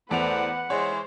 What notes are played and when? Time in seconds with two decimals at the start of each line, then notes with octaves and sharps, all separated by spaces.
0.11 E2 A3 B4 C5 D5 F#5 F7
0.70 E3 G#3 C5 C#5